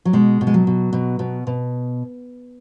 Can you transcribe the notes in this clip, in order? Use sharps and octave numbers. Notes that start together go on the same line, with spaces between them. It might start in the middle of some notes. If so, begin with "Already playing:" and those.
F#3
B2 G#3
B2
G#3
F#3
B2
B2
B2
B2